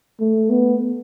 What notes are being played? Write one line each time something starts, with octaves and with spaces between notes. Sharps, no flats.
A3
B3